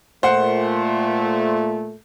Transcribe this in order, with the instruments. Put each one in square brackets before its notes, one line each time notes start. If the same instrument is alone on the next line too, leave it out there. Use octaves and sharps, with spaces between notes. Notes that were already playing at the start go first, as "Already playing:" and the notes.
[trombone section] A#2 A3 [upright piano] C5 F#5